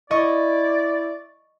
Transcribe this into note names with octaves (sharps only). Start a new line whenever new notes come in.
E4 D5 D#5 C#6